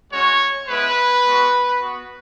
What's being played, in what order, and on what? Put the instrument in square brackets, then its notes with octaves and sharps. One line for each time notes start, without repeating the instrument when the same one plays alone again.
[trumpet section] G#3 C#4 F#4 C#5
G#3 B3 E4 B4
G#3 B3 F#4
B3 F#4